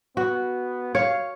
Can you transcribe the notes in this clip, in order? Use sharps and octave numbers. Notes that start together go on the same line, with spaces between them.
B3 F#4
C#5 F5